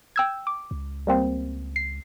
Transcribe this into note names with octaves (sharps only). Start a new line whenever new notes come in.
G5 E6 G#6
D6
C#2
G3 A#3 C4
C7